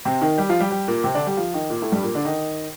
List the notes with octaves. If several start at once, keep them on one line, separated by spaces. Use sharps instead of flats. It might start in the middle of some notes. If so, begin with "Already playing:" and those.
C3 C4
D#3 D#4
G3 G4
F3 F4
G3 G4
G3 G4
A#2 A#3
C3 C4
D3 D4
G3 G4
F3 F4
D#3 D#4
A#2 A#3
A2 A3
G2 G3
A#2 A#3
D3 D4
D#3 D#4